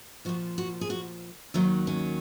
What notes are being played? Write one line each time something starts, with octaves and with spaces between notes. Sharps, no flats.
A#2 F3 F#4
F#4
G#4
F#4
D#2 D#3 F#3 D#4
C#4